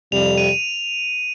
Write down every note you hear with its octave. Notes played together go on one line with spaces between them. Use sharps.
F2 C3 G3 F7
D#7